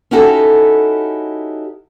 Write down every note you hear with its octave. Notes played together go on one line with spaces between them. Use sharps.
C#4 D#4 E4 F#4 G4 A4